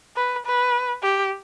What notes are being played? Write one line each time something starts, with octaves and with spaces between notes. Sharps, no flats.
B4
B4
G4